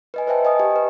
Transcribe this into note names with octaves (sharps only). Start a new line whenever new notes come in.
B4 D#5 G#5
B4 C5 E5 G5 A5
D#5 G#5 D#6
G4
B4